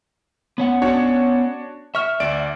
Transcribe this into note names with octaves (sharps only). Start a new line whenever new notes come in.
B3 C#4 F#5
D4 F#4 C#5
E5 C#6 F6
D2 D5 D7